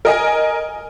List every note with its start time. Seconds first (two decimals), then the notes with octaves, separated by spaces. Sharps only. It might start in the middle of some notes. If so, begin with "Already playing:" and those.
0.05 A#4 D#5 G#5